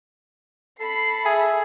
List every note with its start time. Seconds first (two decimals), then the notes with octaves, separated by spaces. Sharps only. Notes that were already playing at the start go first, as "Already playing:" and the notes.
0.80 A4 B5 C7
1.26 G#4 E5